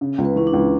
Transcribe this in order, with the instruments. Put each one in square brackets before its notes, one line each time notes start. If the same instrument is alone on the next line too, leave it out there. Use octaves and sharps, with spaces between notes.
[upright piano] C#3
C#2
[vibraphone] B4
[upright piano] E3 [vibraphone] C#4
[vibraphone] D4
[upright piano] C#2